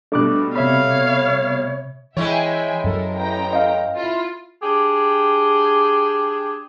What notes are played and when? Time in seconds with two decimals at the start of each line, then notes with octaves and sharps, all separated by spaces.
0.12 B2 G3 A3 D4 D6 F#6
0.56 C3 C#5 E5 F5 B5
2.17 E3 G#3 E4 C#5 E5 G5 G#5
2.84 F#2 F#3 A4 A#4
3.15 A1 G5 A#5
3.53 D#5 F5
3.96 E4 F4
4.63 D4 G4 G#4